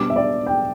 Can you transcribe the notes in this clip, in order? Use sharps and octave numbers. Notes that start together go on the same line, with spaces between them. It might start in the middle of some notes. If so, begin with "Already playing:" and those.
Already playing: B2 G3 B3 D4 D6
E5
D5
G5